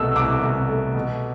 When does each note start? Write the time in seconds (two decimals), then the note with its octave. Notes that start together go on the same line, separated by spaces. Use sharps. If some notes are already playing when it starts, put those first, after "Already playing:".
Already playing: C2 B2 A3 E6
0.16 C2 D6
0.43 C2
0.68 A3
0.94 B2